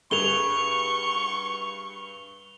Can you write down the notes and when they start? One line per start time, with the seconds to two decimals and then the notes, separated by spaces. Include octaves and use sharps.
0.11 G2 G#4 C#6 F7 G7